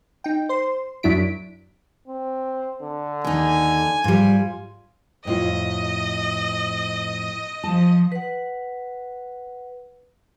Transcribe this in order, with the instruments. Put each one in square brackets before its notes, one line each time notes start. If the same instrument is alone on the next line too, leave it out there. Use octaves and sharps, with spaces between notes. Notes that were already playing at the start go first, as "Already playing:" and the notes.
[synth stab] D#4 G5
C5 C6
F#2 F#3 D4 E4 B6 D7
[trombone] C4
D3
[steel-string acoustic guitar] D#2 D#4 [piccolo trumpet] G#5
[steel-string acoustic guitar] G#2 G3 [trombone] F4
[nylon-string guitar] F2 A2 F4 [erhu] D#5
[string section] F3 [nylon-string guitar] A5
[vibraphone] B4 F#5